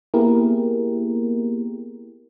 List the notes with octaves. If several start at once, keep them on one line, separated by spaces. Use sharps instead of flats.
A#3 B3 E4 G4 G#4 A#4